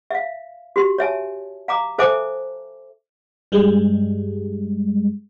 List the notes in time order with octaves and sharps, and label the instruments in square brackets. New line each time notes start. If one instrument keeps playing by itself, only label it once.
[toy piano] E5 F5
F#4 G4 C6
C#5 E5 G#5 A5
F5 A#5 D6
A4 C5 E5 G#5 A5 D6
[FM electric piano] G2 G3 G#3